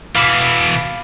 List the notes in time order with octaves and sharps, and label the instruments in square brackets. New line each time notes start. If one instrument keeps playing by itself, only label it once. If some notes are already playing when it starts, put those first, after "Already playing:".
[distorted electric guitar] B2 E3 [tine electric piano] F5 B5 D6